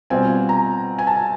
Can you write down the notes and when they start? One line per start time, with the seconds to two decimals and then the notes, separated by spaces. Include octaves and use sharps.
0.10 B2 G3 C4 F4 G#5
0.49 A#5
0.99 G#5
1.07 A5